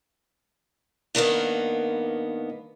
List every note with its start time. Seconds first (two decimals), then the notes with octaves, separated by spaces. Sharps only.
1.15 G2 D#3 A#3 B3